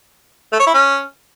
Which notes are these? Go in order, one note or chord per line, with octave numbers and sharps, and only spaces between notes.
A3
C#5
E4
C#4